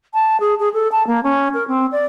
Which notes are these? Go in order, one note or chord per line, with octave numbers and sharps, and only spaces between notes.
A5
G#4
G#4
A4
A5
A#3
C#4
A#4
C4
D5